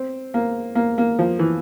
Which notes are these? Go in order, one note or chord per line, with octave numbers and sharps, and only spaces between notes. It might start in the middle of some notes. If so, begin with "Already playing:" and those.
Already playing: C4
A#3
A#3
A#3
F3
E3